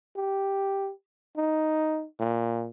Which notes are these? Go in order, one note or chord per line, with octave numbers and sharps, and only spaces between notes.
G4
D#4
A#2